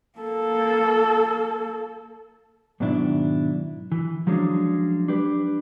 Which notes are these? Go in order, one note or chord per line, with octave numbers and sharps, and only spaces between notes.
A#3 A4
G#2 B2 D#3 F#3 D4 E4
E3
F3 F#3 G#3 C#4 D4
D4 G4 B4